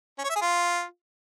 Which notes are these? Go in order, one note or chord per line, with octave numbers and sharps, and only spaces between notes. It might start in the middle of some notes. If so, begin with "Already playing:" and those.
C#4
C#5
E5
G#4
F4